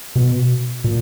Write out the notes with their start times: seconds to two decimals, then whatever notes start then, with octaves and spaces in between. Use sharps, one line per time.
0.16 B2
0.84 A#2